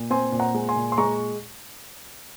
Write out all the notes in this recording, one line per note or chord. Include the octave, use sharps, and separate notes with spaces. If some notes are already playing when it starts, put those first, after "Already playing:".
Already playing: A#2
C4 G#5 C6
A#2
F#5 A#5
G#3
G#5 C6
A#2
C6
G#3 A#5 C#6